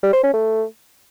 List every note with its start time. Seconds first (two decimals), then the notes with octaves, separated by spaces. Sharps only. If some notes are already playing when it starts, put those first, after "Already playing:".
0.03 G3
0.13 C5
0.23 C#4
0.34 A3